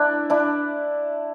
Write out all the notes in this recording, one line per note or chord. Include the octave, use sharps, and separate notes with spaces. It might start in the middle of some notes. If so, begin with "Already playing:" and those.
Already playing: D4 E4
D4 E4